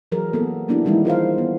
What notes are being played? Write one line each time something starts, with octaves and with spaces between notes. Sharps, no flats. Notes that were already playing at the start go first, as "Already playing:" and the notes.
E3 F#3 G#4 A#4
A#3 B3 A4
F#3 A#3 B3 D4 E4 G4
D#3 E3 G3 G#3 D#4 E4
F4 A#4 C5 F5
B3